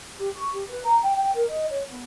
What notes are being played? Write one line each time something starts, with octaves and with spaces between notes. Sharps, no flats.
G4
C#6
G4
B4
A#5
G5
G5
A#4
D#5
C#5
B3